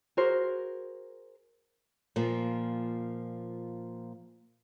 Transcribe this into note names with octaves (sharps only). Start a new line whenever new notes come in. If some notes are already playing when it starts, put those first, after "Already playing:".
F#4 G#4 A#4 C5
A#2 F3 A#3